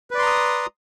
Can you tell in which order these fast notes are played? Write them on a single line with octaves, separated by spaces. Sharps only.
B4 D5 C6 A#5 D#6